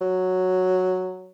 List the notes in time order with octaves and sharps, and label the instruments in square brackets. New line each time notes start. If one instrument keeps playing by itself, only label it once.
[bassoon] F#3